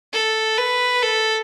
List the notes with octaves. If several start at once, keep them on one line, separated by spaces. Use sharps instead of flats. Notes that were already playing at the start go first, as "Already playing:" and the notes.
A4
B4
A4